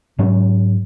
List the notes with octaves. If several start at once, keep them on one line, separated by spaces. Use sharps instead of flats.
G#2 F#3 C#4